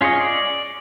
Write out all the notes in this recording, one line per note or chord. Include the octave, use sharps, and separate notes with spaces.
C#4 F4 G#4 C#5 D#5
D5